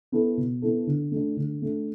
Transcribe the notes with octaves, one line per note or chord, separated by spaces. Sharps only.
B3 E4 A4
B2
B3 E4 A4
D3
A3 D4
D3
A3 D4